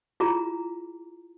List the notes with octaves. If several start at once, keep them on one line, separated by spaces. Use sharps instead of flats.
E4 F4 G#4 A#5